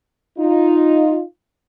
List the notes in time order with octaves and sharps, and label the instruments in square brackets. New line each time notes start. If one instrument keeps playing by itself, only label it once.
[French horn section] D#4 F4